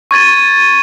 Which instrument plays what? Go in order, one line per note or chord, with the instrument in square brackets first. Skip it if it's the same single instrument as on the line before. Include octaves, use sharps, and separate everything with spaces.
[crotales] C#6 G#6 A6 D#7